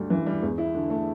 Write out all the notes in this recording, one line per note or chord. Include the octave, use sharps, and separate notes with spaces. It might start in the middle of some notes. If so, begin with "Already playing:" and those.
Already playing: D2 G3
E3
G3
E2
E4
D3
A3